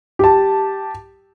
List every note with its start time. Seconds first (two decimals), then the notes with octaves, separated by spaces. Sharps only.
0.19 G4 A5